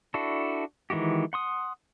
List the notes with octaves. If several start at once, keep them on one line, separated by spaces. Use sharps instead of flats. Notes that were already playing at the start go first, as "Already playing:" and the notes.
D4 E4 F#4 A4
D#3 E3 G#3 F#4 G4
F#5 C6 D#6